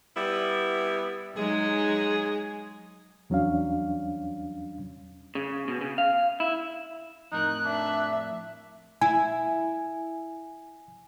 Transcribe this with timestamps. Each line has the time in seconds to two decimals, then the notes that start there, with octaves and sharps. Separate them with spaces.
0.16 G3 B3 E4
1.35 F#3 G#3 D#4 G#4
3.30 E2 F#3 C#4 D4 F5
5.35 C#3
5.68 B2
5.81 C#3
5.98 F5
6.40 E4
7.32 F2 A2 D#4 A#4 F#6
7.65 D4 E5
9.01 E4 G#5